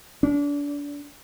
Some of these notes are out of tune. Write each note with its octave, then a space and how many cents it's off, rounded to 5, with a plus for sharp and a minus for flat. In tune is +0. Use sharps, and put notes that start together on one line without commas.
D4 -30